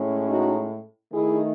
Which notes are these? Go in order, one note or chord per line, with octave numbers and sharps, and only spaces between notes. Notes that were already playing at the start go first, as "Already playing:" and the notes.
Already playing: A2 G#3 C#4
D#4 F#4
D#3 A3 D#4 E4 G#4